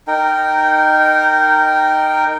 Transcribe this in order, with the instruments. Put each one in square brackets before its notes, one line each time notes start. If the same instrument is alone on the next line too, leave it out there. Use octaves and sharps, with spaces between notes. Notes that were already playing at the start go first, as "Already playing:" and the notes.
[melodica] D#4 A#4 G5